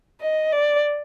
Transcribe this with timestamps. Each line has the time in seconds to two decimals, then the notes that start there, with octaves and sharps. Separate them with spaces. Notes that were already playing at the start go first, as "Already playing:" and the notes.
0.21 D#5
0.52 D5